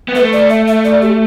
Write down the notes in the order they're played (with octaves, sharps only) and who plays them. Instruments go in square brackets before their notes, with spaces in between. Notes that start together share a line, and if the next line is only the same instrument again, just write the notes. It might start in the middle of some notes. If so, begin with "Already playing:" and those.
[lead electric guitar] B3
[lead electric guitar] A3 [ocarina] B4
[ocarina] D5
E5
E5
D5
G4